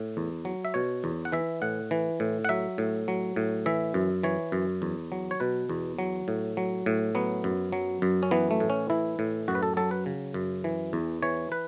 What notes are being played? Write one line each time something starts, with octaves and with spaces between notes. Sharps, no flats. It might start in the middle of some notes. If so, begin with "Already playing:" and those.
Already playing: A2
E2
F#3
E5
B2 C#5
E2
F#5
E3 E5
A2 F#5
E3
A2
F#5
F#3 E5
A2
F#3
A2
E3 E5
F#2
E3 C#5
F#2
E2
F#3
C#5
B2 B4
E2
F#3
A2
F#3
A2
F#3 B3
F#2
F#3
F#2
C#4
E3 B3
A3
A2
C#4
E3 E4
A2
F#2 F#4
B4
A4
F#3 A4
B4
C#3
F#2
E3
E2
E3 C#5
B4